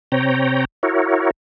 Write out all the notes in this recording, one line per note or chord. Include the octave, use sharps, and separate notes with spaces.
C3 C4 C#5 G5 A#5
E4 F#4 A#4 C#5